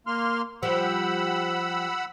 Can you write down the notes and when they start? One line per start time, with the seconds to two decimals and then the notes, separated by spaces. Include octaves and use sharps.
0.07 A#3 C6 F6
0.63 F3 G3 F#5 B5 E6